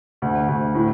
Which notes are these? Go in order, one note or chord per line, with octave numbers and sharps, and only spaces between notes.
D2
D2
A2